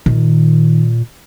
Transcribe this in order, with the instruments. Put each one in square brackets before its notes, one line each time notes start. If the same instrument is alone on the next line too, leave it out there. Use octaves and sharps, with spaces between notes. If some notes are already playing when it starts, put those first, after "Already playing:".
[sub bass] A#2 [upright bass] D#3